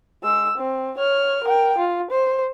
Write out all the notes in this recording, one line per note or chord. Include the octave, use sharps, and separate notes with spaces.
G#3 E6
C4
C#5 F6
A#4 G5
F4
C5